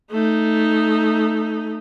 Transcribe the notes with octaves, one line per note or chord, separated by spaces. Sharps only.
A3 D#4